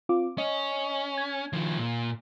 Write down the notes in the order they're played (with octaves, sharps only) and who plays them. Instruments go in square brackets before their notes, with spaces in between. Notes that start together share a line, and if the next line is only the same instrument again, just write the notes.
[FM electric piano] C4 F4 D6
[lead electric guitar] C#4 [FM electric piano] D#5
[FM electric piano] G#6
[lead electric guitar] D#3 F3
A#2